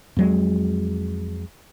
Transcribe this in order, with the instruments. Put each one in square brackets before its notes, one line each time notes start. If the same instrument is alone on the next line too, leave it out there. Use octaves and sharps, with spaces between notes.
[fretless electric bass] F2 F#3 G#3